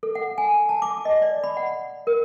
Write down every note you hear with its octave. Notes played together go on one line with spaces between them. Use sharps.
A4
F#5
G#5
A5
D6
D#5
D5
B5
F#5
A#4